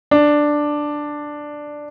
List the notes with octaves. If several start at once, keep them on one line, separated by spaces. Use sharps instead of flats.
D4